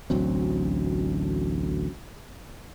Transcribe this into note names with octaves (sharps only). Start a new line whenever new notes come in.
A1 D2 F#3 C4